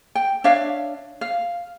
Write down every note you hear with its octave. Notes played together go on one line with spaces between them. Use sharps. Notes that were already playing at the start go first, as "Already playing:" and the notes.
G5
D4 C#5 E5 F5
F5